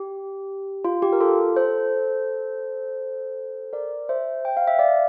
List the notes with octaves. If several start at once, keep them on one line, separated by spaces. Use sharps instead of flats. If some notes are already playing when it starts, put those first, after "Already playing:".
Already playing: G4
F4
G4
A#4
F4 A4
A4 C5
A#4 D5
C5 E5
G5
F5
E5
D5 F5